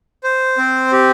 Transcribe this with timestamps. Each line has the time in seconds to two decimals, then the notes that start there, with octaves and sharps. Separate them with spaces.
0.23 C5
0.58 C4
0.92 G4